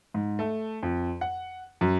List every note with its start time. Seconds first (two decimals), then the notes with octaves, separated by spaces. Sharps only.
0.14 G#2
0.39 A3
0.83 F2
1.21 F#5
1.81 F#2